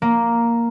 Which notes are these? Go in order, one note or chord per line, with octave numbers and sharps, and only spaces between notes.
A#3